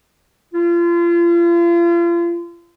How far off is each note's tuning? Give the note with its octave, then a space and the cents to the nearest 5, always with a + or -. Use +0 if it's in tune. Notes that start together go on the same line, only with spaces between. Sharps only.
F4 -35